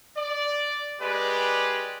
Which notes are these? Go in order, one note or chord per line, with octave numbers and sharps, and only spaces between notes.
D5
G#3 G4 B4 D5